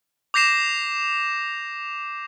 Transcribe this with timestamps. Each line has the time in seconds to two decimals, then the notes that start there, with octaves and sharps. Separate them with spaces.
0.34 D6 G6 A#6 C7 E7